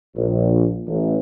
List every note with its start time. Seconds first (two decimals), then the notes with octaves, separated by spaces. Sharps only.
0.16 A#1
0.88 A1